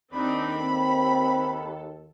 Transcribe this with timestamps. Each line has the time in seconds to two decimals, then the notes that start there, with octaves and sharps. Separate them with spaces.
0.13 D#2 C4 D4 D#4 B5
0.57 C4 A4